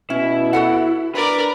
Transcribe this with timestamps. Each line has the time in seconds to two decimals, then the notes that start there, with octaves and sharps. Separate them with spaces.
0.10 B2 C#4 E4
0.53 F#4 A4 F#5
1.15 D4 A#4 B4 D5